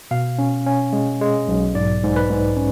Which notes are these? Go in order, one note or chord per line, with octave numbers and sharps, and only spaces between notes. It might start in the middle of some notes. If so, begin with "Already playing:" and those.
B2 F5
C#4
C#4
G#3
G#3
B1
G#2 D5
G#2
B4
G#2
C#4